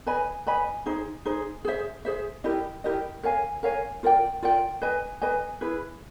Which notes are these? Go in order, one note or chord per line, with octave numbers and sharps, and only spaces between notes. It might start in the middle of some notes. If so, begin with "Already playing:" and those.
B4 D#5 G#5 B5
B4 D#5 G#5 B5
D#4 G#4 C5
D#4 G#4 C5
G#4 C5 E5
G#4 C5 E5
E4 G4 A#4 D#5
E4 G4 A#4 D#5
A#4 C#5 F5 G#5
A#4 C#5 F5 G#5
F4 A#4 D5 G5
F4 A#4 D5 G5
B4 D#5 G#5
B4 D#5 G#5
E4 G#4 B4